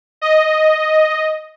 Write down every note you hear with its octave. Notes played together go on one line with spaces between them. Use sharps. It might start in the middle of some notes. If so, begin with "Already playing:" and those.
D#5